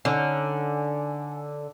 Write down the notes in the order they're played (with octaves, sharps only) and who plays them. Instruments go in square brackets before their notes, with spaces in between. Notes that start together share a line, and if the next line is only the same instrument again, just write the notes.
[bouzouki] D3 [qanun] C#4 D#4 [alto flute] G#5